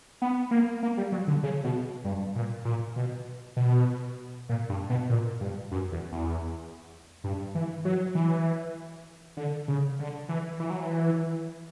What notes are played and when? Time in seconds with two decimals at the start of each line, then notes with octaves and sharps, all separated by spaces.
0.22 B3
0.51 A#3
0.83 A#3
0.98 G3
1.12 F#3
1.27 D3
1.43 C#3
1.64 B2
2.04 G2
2.36 A#2
2.65 A#2
2.96 B2
3.57 B2
4.49 A#2
4.69 G2
4.90 B2
5.10 A#2
5.41 G2
5.72 F#2
5.92 E2
6.12 E2
7.24 G2
7.55 E3
7.85 F#3
8.15 E3
9.37 D3
9.68 C#3
9.99 D3
10.29 E3
10.60 E3
10.70 F#3
10.80 E3